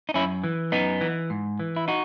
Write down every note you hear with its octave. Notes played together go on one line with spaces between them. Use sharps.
D#4
F#2 C#4 E4
E3
F#2 B3 D#4
E3
G#2
E3
E4
D#4 F#4